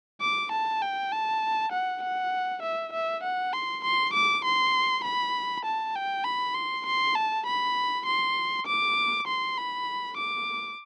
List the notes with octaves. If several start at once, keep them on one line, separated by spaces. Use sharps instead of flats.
D6
A5
G5
A5
F#5
F#5
E5
E5
F#5
C6
C6
D6
C6
B5
A5
G5
B5
C6
C6
A5
B5
C6
D6
C6
B5
D6